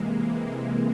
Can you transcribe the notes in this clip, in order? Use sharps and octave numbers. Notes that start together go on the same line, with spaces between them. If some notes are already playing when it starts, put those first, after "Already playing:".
Already playing: C3 E3 G#3 A#3